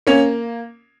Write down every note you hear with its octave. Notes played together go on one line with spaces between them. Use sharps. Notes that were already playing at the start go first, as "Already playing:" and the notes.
A#3 C#4 C#5